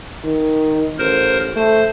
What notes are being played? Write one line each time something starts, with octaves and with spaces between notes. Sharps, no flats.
D#3
A1 A#4 C5
A3 C5